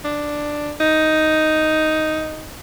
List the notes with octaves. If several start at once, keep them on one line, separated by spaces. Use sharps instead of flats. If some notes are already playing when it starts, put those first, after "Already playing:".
D4
D#4